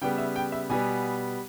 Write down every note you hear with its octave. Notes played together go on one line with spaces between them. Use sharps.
C#3 G3 B3 G5
E5
G5
E5
B2 G3 B3 G#5